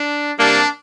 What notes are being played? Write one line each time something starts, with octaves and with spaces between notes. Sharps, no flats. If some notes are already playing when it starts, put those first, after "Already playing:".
Already playing: D4
C3 G3 A#3 D4